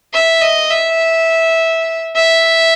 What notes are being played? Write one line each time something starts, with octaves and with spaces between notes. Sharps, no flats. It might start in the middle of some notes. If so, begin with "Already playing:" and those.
E5
D#5
E5
E5